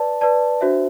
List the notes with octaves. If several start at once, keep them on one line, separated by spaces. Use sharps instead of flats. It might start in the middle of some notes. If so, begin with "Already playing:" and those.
Already playing: B4 D5 A5
B4 D5 A5
D4 F#4 C5 E5